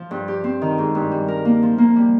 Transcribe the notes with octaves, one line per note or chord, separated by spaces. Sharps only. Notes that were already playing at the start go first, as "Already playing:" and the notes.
Already playing: F3
G2
G4
C4
D#3
G#2
G2
G3
A#4
A#3
F3
A#3
G3